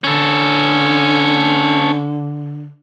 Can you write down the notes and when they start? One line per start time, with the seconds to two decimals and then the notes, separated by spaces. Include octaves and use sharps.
0.04 D3 C#4 A4